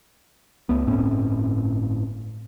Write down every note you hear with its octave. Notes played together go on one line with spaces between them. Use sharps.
C#2 A3 B3
G1 A2 C4 C#4